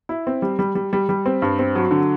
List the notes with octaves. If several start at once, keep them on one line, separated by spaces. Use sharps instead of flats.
E4
C4
G3
G3
G3
G3
G3
C4
G2
C4
F#3
D3